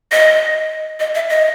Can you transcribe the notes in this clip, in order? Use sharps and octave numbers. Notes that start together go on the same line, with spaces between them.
D#5
D#5
E5
D#5